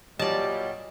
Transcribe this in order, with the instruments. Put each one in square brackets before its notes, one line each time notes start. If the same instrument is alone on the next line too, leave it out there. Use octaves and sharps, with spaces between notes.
[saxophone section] A#2 F#3 G3 [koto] D5 A5 [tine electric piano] D#5